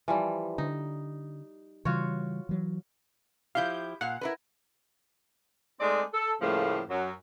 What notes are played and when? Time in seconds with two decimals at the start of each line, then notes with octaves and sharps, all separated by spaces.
0.08 E3 F3 G3
0.58 D3 D#4
1.85 C#3 E3 G3 F4 F#4 C#5
2.49 E3 F#3
3.55 F3 E4 G4 F5 G6
4.01 A#2 F5 F#5
4.21 E4 A#4 B4
5.80 G#3 A3 C4 D#4 D5
6.13 A4
6.41 A2 C#3 F3 G3 A3 A#3
6.89 F#2 F#3